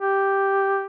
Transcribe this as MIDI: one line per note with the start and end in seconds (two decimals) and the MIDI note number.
0.01 0.86 67